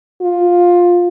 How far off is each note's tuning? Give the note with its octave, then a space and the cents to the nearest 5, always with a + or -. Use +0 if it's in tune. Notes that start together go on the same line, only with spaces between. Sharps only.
F4 +10